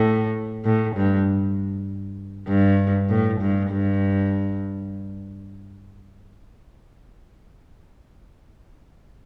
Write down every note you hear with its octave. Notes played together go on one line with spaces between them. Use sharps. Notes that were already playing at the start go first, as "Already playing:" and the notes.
Already playing: A2
A2
G2
G2
A2
G2
G2